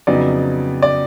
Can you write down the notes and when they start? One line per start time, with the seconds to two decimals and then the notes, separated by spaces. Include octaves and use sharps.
0.07 F2 C#3 F#3 B3 D#4 D5
0.82 D5